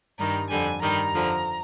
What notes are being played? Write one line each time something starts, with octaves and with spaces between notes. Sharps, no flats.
G2 D#3 G3 A#5
F2 D3 G3 G#5
G2 D#3 G3 A#5
F2 D3 F3